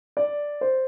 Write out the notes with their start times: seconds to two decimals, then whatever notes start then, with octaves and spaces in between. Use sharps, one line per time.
0.17 D5
0.61 C5